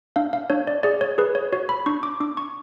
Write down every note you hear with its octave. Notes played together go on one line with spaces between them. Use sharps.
D4 F5
F5
D4 C#5
D5
G#4 D5
C#5
G#4 B4
C#5
F#4 C#5
B5
D4 C#6
D6
D4 D6
C#6